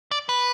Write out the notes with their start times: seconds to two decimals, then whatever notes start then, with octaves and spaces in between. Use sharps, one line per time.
0.11 D5
0.29 B4